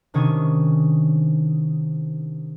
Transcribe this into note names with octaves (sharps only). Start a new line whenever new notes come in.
C3 D#3 C#4 D4 G#5 D#6